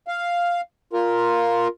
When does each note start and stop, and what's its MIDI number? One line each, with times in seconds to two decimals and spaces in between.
0.08 0.61 77
0.93 1.68 65
0.93 1.68 70